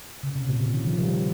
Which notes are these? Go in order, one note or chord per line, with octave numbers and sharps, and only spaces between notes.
C#3
C3
A#2
C#3
D#3
F3
G3